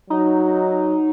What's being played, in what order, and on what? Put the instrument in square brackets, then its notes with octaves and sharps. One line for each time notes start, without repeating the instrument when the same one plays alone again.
[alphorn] F#3 [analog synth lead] D#4